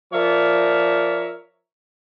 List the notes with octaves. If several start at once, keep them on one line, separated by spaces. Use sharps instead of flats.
F3 A#4 C#5 D5 E5